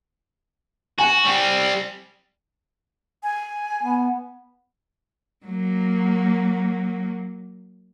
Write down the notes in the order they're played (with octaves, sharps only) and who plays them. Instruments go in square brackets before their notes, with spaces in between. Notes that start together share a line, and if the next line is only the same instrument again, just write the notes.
[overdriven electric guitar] F#4 [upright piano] G#5
[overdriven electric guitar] G3 C4
[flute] G#5
[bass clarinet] B3
[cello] F#3 A#3